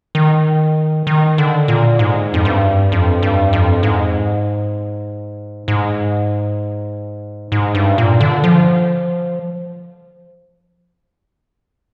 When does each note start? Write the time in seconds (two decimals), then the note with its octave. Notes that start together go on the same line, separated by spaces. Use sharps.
0.15 D#3
1.07 D#3
1.38 D3
1.68 A#2
1.99 G#2
2.34 F2
2.45 G2
2.92 F2
3.23 G2
3.53 F2
3.83 G#2
5.68 G#2
7.52 G#2
7.75 G2
7.98 A#2
8.21 D3
8.44 F3